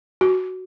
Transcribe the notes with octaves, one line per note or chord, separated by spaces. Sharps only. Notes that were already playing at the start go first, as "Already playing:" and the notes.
F#4